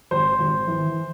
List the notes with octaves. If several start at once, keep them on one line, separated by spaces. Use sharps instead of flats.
G#1 C5
G#1
E3